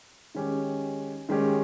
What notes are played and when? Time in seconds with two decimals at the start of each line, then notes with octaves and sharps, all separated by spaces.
0.35 D#3 G#3 C#4 G4
1.29 D#3 G#3 C#4 G4